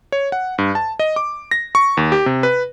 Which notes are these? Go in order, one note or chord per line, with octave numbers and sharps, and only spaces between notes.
C#5
F#5
G2
A5
D#5
D6
A#6
C#6
D#2
G4
C3
B4